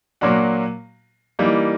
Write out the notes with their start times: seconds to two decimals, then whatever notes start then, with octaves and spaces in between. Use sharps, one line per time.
0.21 A#2 F#3 A#3 D4 F#4
1.39 E3 G3 A#3 D#4